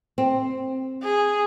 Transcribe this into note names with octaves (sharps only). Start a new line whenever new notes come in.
C4
G#4